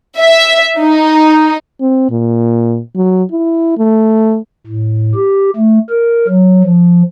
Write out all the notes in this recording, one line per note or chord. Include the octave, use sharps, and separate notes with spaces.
E5
D#4
C4
A#2
F#3
E4
A3
A2
G4
A3
A#4
F#3
F3